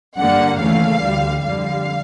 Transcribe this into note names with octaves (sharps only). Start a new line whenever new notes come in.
G2 D3 G3 A#3 F#5
D#2 C#3 E3 A3 F5
D2 D3 G3
F2 D3 G3 F5